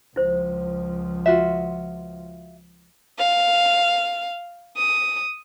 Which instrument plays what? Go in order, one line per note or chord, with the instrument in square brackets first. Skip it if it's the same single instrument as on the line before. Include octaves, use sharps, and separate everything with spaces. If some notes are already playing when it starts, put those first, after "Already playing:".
[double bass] C#2 F3 [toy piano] E4 C5
[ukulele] F4 F#4 E5
[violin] F5
D#6